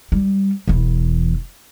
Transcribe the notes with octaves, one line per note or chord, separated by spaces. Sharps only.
G3
E1 E2